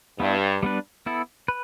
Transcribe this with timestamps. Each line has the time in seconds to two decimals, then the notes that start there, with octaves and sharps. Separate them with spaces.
0.20 G2 B3 E4 G4
0.63 G3 B3 D4 B4
1.06 B3 E4 A4
1.48 B4